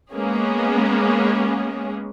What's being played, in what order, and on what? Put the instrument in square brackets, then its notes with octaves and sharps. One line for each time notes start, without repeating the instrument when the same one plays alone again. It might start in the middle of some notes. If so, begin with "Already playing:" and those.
[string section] G#3 A#3 B3 C#4 G#4